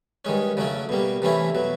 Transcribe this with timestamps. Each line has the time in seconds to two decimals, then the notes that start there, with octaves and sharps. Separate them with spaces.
0.25 G2 D#3 G#3 C#4
0.57 C#3 F#3 A3 C#4
0.89 B2 G3 A#3
1.22 C3 E3 A3 C#4 E4
1.55 B2 F#3